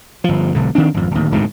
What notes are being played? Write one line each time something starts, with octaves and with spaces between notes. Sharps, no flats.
G1 F3
E1 B1 D3
D#3 C4 D4
G#1 F2
D1 D#2
D#1 D2 G#2 C3